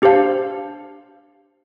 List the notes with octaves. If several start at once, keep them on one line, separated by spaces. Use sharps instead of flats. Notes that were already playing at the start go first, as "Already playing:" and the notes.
D4 G4 C5 F5 A5